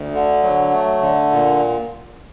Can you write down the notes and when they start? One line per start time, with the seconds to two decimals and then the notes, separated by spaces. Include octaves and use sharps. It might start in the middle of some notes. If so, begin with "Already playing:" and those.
Already playing: D2
0.14 D3
0.43 F#3
0.73 A3
1.02 D3
1.32 A#2